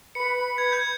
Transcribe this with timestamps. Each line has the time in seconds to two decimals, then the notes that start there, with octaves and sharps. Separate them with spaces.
0.15 B4 B5 C#7
0.58 G#6
0.72 G6 G#6